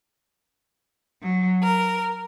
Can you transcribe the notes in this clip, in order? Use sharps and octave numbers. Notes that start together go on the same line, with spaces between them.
F#3
A#4